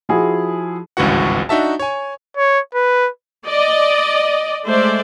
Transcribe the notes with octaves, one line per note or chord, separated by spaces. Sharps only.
F3 E4 F#4 G#4
G#1 C#2 G2 E3 F#4 F#5
D4 D#4 F#4 E5 A5
C#5 G#5
C#5
B4
D5 D#5
G#3 A3 C5 D5 E5